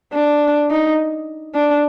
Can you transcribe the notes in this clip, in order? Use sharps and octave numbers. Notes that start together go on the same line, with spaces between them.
D4
D#4
D4